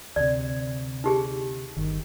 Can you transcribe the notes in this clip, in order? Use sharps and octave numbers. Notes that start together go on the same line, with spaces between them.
D2 C3 D5
D#4 G4 G#4
G1 D#3